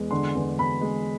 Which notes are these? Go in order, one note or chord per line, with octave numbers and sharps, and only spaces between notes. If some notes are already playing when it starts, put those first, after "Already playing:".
Already playing: E2 G#3
D3 C6
E2
E2 B5
G#3